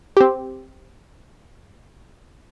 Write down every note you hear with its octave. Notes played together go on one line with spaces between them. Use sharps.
C4 G4